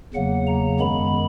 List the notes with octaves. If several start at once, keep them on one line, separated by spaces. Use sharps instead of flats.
E2 C#3 F#3 A#3 F#5
A#5
F#2 D#3 G#3 B3 B5